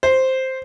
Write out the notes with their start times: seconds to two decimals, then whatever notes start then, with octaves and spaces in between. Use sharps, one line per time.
0.03 C5